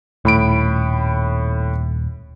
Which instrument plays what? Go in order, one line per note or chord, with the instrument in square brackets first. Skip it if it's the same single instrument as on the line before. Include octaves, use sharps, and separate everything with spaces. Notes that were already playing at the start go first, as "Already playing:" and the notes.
[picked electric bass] D#1 [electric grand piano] A2 B5 D7